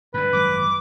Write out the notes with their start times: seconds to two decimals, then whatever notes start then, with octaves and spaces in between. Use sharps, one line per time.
0.14 G2 D3 B4
0.33 G#1 F#2 F#3 D6